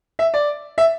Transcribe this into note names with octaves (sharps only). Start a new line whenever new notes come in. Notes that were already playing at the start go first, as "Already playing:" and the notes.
E5
D5
E5